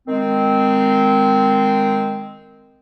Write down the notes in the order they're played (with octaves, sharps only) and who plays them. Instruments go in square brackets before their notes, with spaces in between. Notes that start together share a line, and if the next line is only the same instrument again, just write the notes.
[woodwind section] D#3 G#3 C4